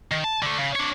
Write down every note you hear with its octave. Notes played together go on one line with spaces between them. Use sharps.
D#3
A5
D3 A3
C#3
D4 C#5